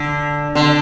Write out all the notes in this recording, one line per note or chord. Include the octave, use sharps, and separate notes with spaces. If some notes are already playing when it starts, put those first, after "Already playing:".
Already playing: D3
D3